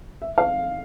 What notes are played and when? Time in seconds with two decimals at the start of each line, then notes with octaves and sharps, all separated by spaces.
0.22 E5
0.38 F5